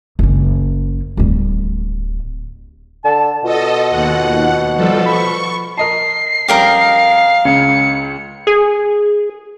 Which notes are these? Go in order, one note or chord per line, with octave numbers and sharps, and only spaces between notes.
F#1 C#4
D1 G3
D3 A5
B2 F4 A4 D#5
D#2 F#5
F3 G3 A4
B5 C#6
A#4 D#5 A5 C7
F2 G3 C#4 G4 A#4 D#5 F5
C#2 C#3 C#7
G#4